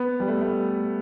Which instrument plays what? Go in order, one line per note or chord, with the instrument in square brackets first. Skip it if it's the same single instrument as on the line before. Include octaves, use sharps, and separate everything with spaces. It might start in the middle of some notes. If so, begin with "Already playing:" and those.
Already playing: [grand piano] B3
G3
A3
A3